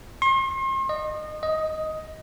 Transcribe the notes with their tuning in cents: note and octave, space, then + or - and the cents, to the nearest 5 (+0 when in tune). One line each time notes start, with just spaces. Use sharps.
C6 +40
D#5 -25
D#5 +10